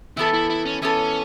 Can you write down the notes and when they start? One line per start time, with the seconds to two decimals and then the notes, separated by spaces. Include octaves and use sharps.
0.17 E3 B3 E4 A4
0.34 E4
0.50 E4
0.66 C#4
0.82 E3 B3 C#4 A4